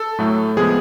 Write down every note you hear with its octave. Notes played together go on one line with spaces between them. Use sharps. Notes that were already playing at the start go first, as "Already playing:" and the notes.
Already playing: A4
A2 F#3 A3
C3 F3 G#3 B3 G#4